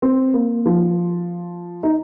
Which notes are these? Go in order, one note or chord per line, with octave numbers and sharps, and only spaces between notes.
C4
A#3
F3
D#4